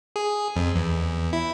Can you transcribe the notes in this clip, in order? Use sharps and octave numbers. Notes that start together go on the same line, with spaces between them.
G#4
F2
E2
E4